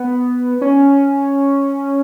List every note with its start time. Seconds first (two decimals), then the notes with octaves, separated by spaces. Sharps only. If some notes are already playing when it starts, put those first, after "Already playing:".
Already playing: B3
0.61 C#4